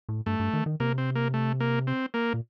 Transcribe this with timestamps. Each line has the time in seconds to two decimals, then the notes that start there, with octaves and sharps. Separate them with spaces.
0.09 A2
0.26 G2 A3
0.40 G2
0.54 D#3
0.66 D#3
0.80 C3 A#3
0.98 C4
1.15 A#3
1.34 A3
1.60 A#3
1.87 C4
2.14 A#3
2.34 A#2